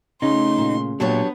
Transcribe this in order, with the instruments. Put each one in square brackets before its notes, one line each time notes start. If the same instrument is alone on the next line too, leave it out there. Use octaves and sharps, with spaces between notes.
[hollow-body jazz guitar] C#3 C#4 [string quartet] A3 C6 [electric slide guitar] D#4
[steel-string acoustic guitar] A#2
[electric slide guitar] A#2 [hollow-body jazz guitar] F#3 [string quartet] B3 [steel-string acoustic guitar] D4 G4 C#5